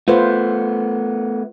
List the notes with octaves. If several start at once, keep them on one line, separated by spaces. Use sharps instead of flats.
A3 B3 F4 B4 C5